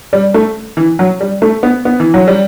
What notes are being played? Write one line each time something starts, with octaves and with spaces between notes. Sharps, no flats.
G3
A3
E3
F#3
G3
A3
B3
B3
E3
F#3
G3